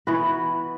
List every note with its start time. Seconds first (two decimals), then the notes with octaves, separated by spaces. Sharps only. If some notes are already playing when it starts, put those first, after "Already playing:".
0.07 E3 B3 F#4 B4